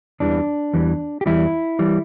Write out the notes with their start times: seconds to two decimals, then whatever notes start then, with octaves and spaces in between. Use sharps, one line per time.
0.20 E2 E3 G3 D4
0.73 E2 E3 G3
1.21 G4
1.26 E2 E3 G3 E4
1.79 E3 G3